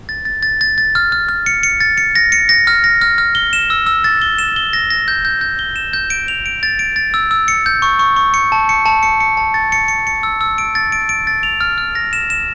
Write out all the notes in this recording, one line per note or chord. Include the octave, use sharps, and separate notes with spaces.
A6
A6
A6
A6
A6
F6
F6
F6
C#7
C#7
A6
C#7
A#6
C#7
A#6
F6
A#6
F6
F6
G7
E7
E6
E6
A6
G7
E7
G7
A#6
A#6
G6
G6
G6
G7
E7
G6
D7
F7
D7
A6
D7
A6
E6
E6
C#7
G6
C#6
C#6
C#6
C#7
A5
C#7
A5
C#7
C#7
A5
A6
C#7
C#7
C#7
E6
E6
D7
A6
D7
D7
A6
F7
F6
F6
A#6
E7
E7